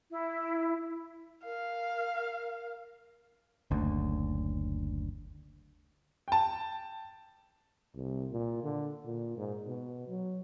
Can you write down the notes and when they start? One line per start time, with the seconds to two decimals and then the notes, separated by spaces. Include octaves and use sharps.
0.11 E4
1.45 A#4 F5
3.71 F#1 D2
6.28 G5 A5
7.95 C2
8.32 A#2
8.63 D3
9.05 A#2
9.37 G#2
9.67 B2
10.08 F#3